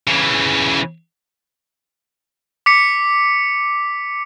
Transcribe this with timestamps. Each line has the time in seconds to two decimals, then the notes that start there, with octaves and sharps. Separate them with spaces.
0.08 C#3 E3
2.66 D6 B6 C#7